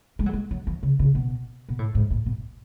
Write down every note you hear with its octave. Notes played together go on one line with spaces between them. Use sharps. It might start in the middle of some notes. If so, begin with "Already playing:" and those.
G#3
F#3
G#3
F#3
E3
C#3
C#3
B2
B2
A2
G#2
A2
B2